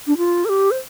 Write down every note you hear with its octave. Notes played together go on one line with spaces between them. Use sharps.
D4
F4
A#4
G4
C5